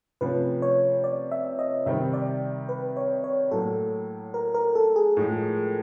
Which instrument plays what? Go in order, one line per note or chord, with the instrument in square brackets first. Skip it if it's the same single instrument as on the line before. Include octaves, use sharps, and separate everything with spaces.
[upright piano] C3 F3 A3 C#4 [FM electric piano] B4
[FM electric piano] C#5
D5
E5
D#5
[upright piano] C3 D#3 G3 C4 [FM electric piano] E5
[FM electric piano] D5
B4
C#5
C#5
[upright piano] A2 F#3 A#3 [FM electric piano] A4
[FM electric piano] A#4
A#4
A4
G#4
[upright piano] A2 F3 G#3